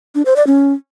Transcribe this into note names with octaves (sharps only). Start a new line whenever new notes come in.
D4
C5
D5
C#4